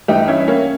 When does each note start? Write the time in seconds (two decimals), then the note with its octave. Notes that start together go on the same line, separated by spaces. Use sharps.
0.08 G2 E3 D#4 G4
0.28 C#4 E4
0.48 A#3 C#4